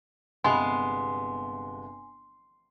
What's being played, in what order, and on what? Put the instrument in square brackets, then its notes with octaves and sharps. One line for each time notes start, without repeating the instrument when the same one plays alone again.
[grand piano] G1 C3 F7 [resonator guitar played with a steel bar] G#3 B3 [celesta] G#5 [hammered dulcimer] C6